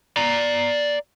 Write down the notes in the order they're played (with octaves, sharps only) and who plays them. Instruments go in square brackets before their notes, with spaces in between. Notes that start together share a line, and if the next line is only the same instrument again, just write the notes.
[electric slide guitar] D5 A#5